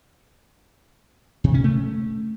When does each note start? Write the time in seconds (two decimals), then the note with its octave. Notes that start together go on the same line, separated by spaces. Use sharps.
1.44 C3
1.54 C#4
1.64 A3